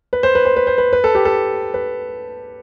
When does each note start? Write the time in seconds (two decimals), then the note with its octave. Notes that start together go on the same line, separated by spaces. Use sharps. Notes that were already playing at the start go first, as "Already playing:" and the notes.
0.13 B4
0.23 C5
0.35 B4
0.45 C5
0.56 B4
0.67 C5
0.78 B4
0.93 B4
1.04 A4
1.15 G4
1.25 A4
1.74 B4